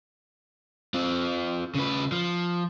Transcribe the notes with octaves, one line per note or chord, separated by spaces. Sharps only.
C4 F4
C#3 B4
F3